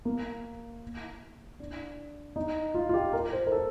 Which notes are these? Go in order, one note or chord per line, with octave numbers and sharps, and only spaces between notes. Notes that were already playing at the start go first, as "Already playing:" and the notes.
A#3
D4
D#4
F4
F4
G4
A#4
C5
A#4
A4